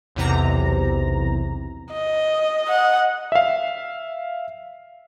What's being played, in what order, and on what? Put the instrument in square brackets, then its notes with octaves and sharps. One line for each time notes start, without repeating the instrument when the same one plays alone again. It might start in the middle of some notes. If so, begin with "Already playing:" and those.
[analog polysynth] B1 E2 C3 A#5
[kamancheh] D#5
[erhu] F#5
[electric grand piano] E5 F5